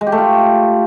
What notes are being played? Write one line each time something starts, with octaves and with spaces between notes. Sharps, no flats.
G#3
G4
A3
F4